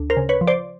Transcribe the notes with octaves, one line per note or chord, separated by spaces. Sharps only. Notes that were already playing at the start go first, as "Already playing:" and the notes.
Already playing: D2
A#4 C5
C#3
B4 C#5
F3
C5 D5